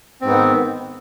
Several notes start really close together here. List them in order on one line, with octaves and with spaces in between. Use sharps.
C4 G#2 B3 D#3